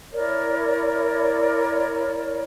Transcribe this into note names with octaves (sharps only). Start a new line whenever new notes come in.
E4 A#4 C#5 D5